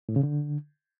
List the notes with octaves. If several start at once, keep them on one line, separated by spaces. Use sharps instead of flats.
A2
C#3
D3